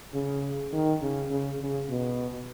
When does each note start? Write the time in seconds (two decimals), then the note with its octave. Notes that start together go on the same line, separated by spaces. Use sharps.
0.14 C#3
0.73 D#3
1.01 C#3
1.30 C#3
1.61 C#3
1.90 B2